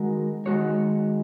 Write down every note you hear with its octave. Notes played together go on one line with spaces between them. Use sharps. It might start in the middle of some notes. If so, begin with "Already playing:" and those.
Already playing: D#3 G#3 F#4 A#4
D#3 G#3 F#4 C#5